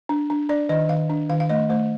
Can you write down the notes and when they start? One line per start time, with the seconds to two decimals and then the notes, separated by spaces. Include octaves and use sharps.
0.09 D4
0.30 D4
0.49 D4 D5
0.69 D#3 D#5
0.89 D#3 F5
1.10 D4
1.30 D#3 F5
1.40 F5
1.49 A3 D#5
1.70 A3 C5